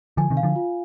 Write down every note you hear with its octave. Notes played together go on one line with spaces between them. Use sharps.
D3 F3 G#5
C3 D#3
F5
D3 F3
F4